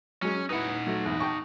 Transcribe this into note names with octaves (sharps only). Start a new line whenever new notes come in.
F#3 G#3 C#4
D#4 E4 B4 F#5
F#3 A3
G#1 E2
G5 A5 C#6